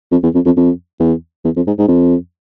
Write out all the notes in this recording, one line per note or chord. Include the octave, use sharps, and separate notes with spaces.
F2
E2
F2
F2
F2
E2
E2
F2
G#2
G#2
F2